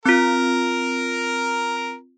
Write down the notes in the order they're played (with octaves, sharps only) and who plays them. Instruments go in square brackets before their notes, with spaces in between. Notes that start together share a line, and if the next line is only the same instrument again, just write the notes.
[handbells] C4 F4 [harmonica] A#4 A#5